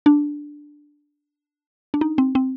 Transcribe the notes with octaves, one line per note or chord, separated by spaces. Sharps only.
D4
D4
D#4
C4
C4